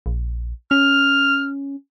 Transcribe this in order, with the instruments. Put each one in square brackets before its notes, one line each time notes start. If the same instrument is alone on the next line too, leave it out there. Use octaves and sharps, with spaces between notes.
[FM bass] A#1
[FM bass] C#4 [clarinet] F6